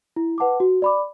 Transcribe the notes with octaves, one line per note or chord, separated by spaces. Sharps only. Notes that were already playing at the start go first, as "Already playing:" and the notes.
E4
B4 F#5 A5 D6
F#4
D5 B5 D6